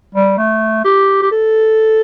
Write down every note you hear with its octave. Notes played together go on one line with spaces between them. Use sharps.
G3
A3
G4
G4
A4